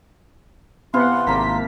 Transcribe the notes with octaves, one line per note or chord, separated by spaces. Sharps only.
C3 E3 B3 F5 F#5 C6
G#1 C3 A#3 A5 A#5 B6